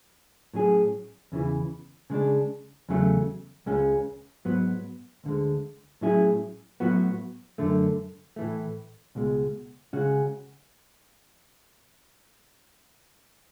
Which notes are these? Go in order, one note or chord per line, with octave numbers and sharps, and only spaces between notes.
A2 F#3 C#4 G#4
E2 C#3 E3
C#3 G#3 D4
E2 C#3 F#3 A3
C#2 C#3 G#3 C#4
G#2 F#3 B3
D2 D3 G#3
A2 F#3 C#4 E4 G#4
A2 F#3 B3 F#4
F#2 D3 A3
A2 E3 A3
C#2 B2 G#3
C#3 G#3 C#4 F#4